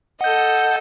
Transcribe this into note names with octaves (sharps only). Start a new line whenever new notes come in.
A4 D#5 F#5 G6